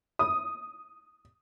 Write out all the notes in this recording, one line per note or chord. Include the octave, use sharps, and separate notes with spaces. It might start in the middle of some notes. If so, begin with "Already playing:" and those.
D#6